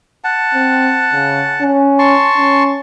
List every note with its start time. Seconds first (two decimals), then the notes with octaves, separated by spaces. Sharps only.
0.24 F#5 A5
0.54 C4
1.13 C#3
1.61 C#4
1.99 A5 C6 C#6
2.37 C#4